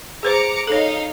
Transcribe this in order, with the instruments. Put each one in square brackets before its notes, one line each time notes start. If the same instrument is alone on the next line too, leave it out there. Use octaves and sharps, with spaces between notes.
[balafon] G#4 B4 C5 [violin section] A#5 D6 C#7
[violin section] D#4 F5 [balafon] A4 C#5